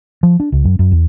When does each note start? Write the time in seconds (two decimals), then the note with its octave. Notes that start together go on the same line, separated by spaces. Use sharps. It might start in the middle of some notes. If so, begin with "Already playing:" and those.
0.23 F3
0.40 D4
0.52 C#2
0.64 F#2
0.79 F#2
0.92 E2